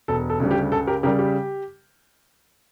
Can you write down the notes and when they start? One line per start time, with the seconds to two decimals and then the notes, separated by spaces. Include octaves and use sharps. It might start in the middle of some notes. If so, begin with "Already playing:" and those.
0.08 E1 A4
0.30 A4
0.40 D2 C#3 G3
0.51 G4
0.72 C#2 A4
0.87 G4 A#4
1.03 C#3 G4 A#4
1.06 G3
1.19 G4